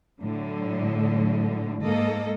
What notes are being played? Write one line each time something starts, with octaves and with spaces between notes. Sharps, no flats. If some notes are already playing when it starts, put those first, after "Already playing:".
A2 D3 F#3
G#2 A#3 A4 D#5